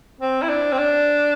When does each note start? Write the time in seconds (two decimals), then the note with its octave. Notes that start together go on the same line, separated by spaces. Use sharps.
0.20 C4
0.42 E4
0.49 D4
0.72 C4
0.78 D4